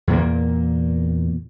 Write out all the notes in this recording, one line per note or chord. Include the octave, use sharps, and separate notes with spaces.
E2 A#2 A#3